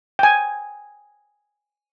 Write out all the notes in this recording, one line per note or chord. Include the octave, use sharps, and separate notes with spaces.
G5 G#5